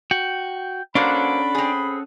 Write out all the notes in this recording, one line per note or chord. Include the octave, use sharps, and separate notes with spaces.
F#4 G5
F#3 A#3 C#4 D4 A4 C5 F#5 B5
C4 G#4